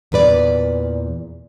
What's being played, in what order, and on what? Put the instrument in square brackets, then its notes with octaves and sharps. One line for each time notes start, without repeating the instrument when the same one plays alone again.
[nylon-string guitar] E2 A#2 B4 D5